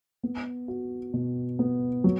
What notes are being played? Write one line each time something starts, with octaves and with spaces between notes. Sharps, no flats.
B3
F#4
B2
B3
F#3